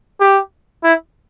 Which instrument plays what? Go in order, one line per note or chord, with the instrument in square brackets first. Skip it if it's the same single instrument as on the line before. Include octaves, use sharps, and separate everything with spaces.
[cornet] G4
E4